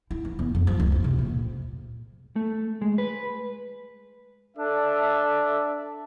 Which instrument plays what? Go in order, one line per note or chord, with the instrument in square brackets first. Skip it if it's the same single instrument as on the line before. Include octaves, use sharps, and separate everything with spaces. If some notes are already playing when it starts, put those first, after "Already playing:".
[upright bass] E4
E3
E2
F2
F3
C#2
F2
C3
A#2
[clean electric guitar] A3
G#3
B4
[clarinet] D4 [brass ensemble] A4 D5 E5